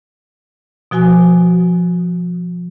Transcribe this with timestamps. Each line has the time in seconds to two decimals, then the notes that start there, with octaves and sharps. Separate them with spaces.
0.91 B2 F3 F#4 G#5 D#6